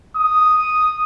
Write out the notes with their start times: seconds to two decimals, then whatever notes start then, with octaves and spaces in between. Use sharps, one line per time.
0.17 D#6